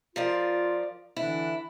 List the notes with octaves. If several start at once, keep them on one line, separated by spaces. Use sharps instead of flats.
F3 F4 A#4 D5
D3 E3 D4 E4